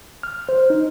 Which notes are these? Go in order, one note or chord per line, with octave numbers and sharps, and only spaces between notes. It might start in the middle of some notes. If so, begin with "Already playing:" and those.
F6
C5
D#4